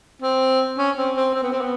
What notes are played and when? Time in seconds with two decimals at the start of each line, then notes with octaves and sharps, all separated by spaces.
0.22 C4
0.78 C#4
0.98 C4
1.16 C4
1.34 C4
1.43 B3
1.52 C4
1.61 B3